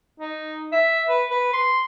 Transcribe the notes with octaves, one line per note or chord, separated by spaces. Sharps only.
D#4
E5
B4
B4
C6